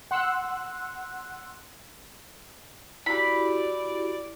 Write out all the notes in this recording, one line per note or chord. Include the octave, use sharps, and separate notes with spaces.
F#5 C6 E6 F#6
E4 F#4 G4 D5 B5